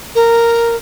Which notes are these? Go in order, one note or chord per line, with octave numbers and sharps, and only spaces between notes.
A#4